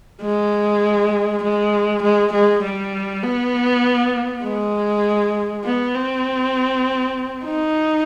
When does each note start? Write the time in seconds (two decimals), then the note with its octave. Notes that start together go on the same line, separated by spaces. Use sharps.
0.22 G#3
1.43 G#3
2.02 G#3
2.32 G#3
2.62 G3
3.23 B3
4.43 G#3
5.65 B3
5.95 C4
7.45 D#4